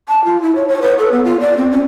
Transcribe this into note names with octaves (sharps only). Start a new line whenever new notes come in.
A5
F4
E4
C#5
C#5
B4
A4
B3
F4
D5
C4
C#4